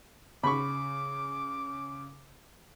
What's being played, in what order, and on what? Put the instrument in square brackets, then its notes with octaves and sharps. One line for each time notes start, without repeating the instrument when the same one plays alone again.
[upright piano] C#3 [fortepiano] B5 C#6 [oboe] D6